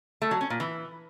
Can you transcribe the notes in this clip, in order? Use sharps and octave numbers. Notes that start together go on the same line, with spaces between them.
A3
F#3
C#4
A#2
E3